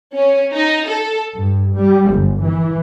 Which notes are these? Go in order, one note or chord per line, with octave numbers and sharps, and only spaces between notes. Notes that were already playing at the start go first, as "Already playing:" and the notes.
C#4
D#4
A4
G2
G3
G1
E3